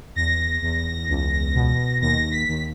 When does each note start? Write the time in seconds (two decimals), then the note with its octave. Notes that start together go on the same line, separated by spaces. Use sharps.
0.16 E2 A#6
0.62 E2
1.09 C#2
1.55 B2
2.01 D#2 A#6
2.32 B6
2.48 D#2